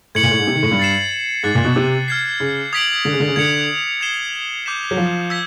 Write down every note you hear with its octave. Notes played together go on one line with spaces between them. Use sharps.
A2 G#6 C#7 F#7
A#2
A2
G#2
C3
D#3
A2
G2
A6 C7 E7
G#2 D6 F#6 A6 C7
A#2
B2
C3
F6 G#6 C7
C#3
D#6 G#6 B6 D7 F#7
D3
C#3
D3
C#3
D3 G#6 C#7 F7
G#6 C7 E7 G7
D6 G6 B6 E7
F#3
F3
E6 G#6 B6